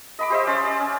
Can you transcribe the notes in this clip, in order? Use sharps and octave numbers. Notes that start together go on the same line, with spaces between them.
D#5 B5 D6
G4 C5 D#5 E5
C#4 D5 C6
D5
C#4